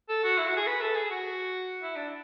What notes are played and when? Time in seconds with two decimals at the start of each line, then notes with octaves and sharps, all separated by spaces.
0.09 A4
0.24 F#4
0.38 E4
0.48 F#4
0.57 G#4
0.67 B4
0.81 A4
0.96 G#4
1.11 F#4
1.82 E4
1.96 D4